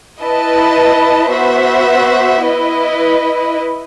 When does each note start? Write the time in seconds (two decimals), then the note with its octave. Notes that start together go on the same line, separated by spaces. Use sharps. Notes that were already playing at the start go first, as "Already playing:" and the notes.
0.21 E4 B4 D#5 A5
1.33 B3 F#4 C5 E5
2.46 E4 B4 D#5